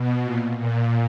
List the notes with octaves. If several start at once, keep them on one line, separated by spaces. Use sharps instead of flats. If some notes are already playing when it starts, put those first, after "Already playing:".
Already playing: B2
A#2
A#2